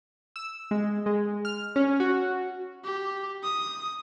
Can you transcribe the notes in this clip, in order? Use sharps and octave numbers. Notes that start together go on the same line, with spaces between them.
E6
G#3
G#3
F6
C#4
F#4
G4
D#6